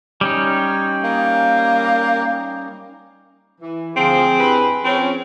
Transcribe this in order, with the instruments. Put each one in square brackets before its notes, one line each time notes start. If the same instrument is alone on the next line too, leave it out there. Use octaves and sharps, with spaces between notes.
[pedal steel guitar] G3 C#4 D#4 [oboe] G5
[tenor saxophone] A#3
[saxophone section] E3
[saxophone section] D2 F3 [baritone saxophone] C4 [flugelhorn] G#4
[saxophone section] G2 E4 B4
[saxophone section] F3 C#4 [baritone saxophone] C4